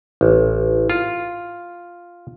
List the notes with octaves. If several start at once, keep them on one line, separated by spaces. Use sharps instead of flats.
A1
F4